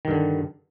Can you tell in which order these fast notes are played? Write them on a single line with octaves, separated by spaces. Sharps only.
D#3 G2 D3